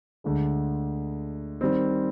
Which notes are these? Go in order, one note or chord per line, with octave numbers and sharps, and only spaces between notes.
D2 D3 G#3
D#3 G3 C4